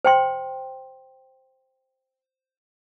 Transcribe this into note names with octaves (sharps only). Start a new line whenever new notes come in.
C5 G5 C6